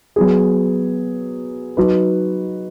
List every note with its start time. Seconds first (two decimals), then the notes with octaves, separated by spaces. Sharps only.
0.16 F#3 B3 G#4
1.77 F#3 D#4 F#4 B4